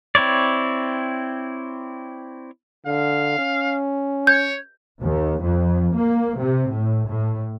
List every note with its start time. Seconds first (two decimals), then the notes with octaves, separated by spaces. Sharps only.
0.15 C4 E4 C#5 D5
2.86 D3 F5
3.38 C#4
4.27 C#5 G6
5.01 D#2
5.41 F2
5.95 A#3
6.38 C3
6.72 A2
7.07 A2